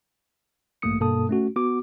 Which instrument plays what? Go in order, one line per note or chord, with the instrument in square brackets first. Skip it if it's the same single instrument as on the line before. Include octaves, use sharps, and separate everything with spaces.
[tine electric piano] A1 G2 A3 A#3 D#6 C#7
G2 B2 A#3 A4 A5 D#6
A3 C#4 F#4
B3 F#4 D6